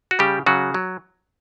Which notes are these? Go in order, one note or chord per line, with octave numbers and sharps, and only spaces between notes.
F#4
C#3 G3 G4
C#3 F#3 F#4
F#3